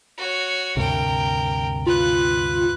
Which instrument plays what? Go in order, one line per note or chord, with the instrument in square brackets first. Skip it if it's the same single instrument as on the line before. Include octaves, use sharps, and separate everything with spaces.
[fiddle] F#4 C#5
[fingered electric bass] D2 G2 C3 [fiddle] A#4 G5
[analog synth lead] F4 [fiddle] B4 F#6